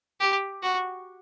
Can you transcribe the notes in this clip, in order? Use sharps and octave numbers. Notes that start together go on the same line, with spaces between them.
G4
F#4